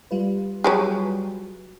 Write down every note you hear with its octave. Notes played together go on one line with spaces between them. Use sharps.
G3 F4 B4
F#3 G4 G#4